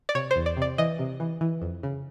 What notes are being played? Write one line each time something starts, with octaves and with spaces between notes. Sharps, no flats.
D5
C3 C#5
E2 C5
D5
C3 D5
E3 D#5
C3
E3
E3
F2
C#3